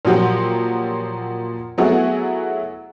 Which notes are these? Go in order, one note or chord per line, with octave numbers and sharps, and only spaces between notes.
A#2 F3 F#3 F#4 G4
F#3 A3 B3 E4 F#4 G#4